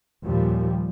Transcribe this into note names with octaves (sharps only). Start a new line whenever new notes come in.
D#2 A#2 F3 G3